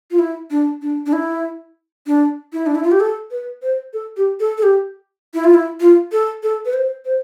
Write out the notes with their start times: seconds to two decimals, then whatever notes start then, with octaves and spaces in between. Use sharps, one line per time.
0.11 F4
0.19 E4
0.51 D4
0.82 D4
1.06 D4
1.13 E4
2.07 D4
2.53 E4
2.66 D4
2.75 E4
2.83 F4
2.91 G4
3.00 A4
3.31 B4
3.62 C5
3.93 A4
4.17 G4
4.40 A4
4.58 A4
4.63 G4
5.34 E4
5.44 F4
5.54 E4
5.80 F4
6.12 A4
6.43 A4
6.65 B4
6.74 C5
7.05 C5